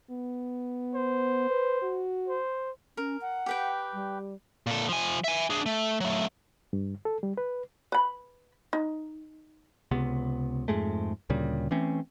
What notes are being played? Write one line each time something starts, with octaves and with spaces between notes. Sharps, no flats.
B3
C5
B4
F#4
C5
C#4 A#4
F#5
G4 B4 G5
G3
A#2 A4
F3 G#5
E5 G#5
D4 G#4
A3
F#3 A3
G2
A4
G3
B4
B4 B5
D#4
C#2 C3 B3
F2 G#2 G#3 A3
D2 A#2 C#3 G3
E3 A3 C4 C#4